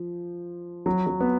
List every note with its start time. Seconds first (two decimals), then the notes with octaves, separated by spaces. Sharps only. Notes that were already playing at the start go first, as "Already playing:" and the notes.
Already playing: F3
0.86 F#3
1.07 F#3
1.21 B3